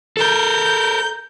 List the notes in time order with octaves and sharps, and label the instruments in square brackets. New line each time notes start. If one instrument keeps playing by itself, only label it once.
[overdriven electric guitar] A4 A#4 [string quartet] G6